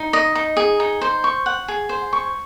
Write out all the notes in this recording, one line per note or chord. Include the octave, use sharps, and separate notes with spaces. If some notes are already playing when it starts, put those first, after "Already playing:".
Already playing: D#4
D#5
D#4
G#4
D#4
C5
C#6
F#5
G#4
C5
C#6